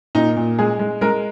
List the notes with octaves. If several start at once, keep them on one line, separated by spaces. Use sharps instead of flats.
A#2 D#4
A#2
G#3 G#4
G#3
G#3 A#4